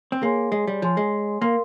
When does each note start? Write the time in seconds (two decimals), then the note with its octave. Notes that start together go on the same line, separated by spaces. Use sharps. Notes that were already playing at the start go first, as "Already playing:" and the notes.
0.12 C4
0.22 A#3 G#4 C#5 G#5 C6
0.52 G#3
0.67 G3
0.82 F3 C#5 G#5 C6
0.97 G#3
1.41 A#3 A#4 F5 C6